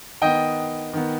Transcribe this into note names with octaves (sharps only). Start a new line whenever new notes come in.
D#3 B3 D#5 G5
D#3 B3